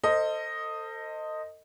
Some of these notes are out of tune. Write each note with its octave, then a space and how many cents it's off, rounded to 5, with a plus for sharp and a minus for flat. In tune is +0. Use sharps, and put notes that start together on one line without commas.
A4 +35 C5 +0 D#5 +0